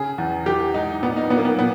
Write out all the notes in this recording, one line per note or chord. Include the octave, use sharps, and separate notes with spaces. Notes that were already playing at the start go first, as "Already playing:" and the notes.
Already playing: C#3 G#4
E2
E3 G4
G#2 D#4
A#2 B3
D#4
A#2 B3
A#3
B3
A#2 B3